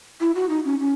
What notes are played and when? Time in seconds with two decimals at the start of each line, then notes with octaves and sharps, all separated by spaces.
0.21 E4
0.35 F#4
0.49 D#4
0.65 C#4
0.80 C#4